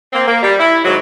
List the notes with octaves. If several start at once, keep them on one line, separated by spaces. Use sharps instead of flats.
A#3 C4
A#3
G3
E4
G#2 D#3 F#3